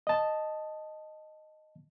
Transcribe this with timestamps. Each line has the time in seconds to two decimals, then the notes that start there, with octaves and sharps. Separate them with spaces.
0.07 D#5 A5